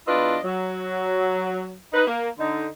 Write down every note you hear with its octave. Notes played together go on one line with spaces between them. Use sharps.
E2 D4 E4 F4 B4 D#5
F#3
D#4 B4
A#3
D3 D#4